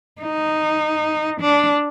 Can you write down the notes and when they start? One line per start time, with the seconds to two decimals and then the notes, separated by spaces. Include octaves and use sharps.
0.21 D#4
1.41 D4